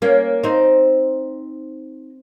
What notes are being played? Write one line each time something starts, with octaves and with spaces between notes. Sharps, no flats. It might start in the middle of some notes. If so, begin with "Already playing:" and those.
A#3 C#4
C4 D#4